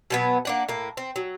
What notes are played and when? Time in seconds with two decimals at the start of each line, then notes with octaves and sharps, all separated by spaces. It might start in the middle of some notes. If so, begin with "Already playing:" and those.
0.10 B2 F#3 B3
0.45 A#3 D4 F#5
0.69 A2 A#3
0.97 C4
1.16 F#3